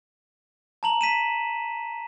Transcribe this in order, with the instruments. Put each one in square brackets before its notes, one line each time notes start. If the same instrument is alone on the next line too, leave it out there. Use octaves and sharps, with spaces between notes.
[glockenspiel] A5 A#5 F#7
B6 D#7 E7